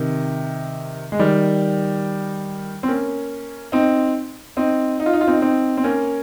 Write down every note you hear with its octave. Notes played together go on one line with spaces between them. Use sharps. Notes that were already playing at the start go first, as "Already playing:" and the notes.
Already playing: C3 D#3
G#3
D#3 G3
C4
A#3 C#4
C4 D#4
C4 D#4
D#4
F4
D#4
F4
C4 D#4
C4 D#4
C4
A#3 C#4